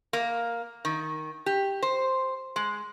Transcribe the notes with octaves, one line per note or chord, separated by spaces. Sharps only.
A#3
D#3
G4
C5
G#3